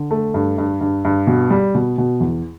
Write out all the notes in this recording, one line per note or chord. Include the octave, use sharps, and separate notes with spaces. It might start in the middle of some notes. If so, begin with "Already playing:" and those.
Already playing: D3
A3
G2
G2
G2
G2
B2
G3
B2
B2
E2